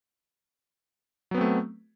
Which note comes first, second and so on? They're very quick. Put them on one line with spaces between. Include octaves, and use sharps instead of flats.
F#3 B3 C4 A3